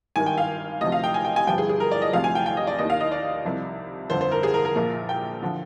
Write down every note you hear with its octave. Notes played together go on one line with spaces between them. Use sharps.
G#1 G2 D#3 G#5
G5
F5
D2 C3 F3 D#5
F5
G5
G#5
G5
G#5
G1 G2 F3 G5
G#4
G#4
A#4
D5
D#5
D2 C3 F3 F5
G#5
G5
G5
D#5
D5
D#2 D#3 D#5
F5
D#5
D5
C2 C3 F3
G1 F2 D3 F3 C5
C5
A#4
G#4
A#4
A#4
A#1 A#2 F3
G5
D3 F3